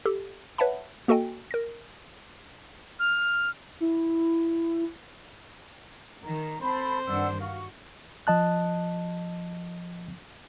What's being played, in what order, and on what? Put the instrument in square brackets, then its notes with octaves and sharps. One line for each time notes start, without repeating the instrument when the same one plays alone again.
[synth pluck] G4 A4
B4 C#5 E5 F#5 A5 B5
A#3 F#4 A4 D#5 G5 G#5
A#4 A#6
[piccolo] F6
[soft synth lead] E4
[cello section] D#3 [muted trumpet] A#5
[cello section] C4 [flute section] A4 B5 [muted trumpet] C5
[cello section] G2 D#3 D4 [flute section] D5 F#5 E6
[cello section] F#4 [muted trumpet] F5 [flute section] C#6
[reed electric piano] F3 D#5 A5 F#6